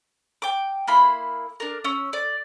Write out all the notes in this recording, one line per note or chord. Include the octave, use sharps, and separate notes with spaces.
G5 D6
A#3 E4 B5 C6
D4 A#4
C#4 E6
D5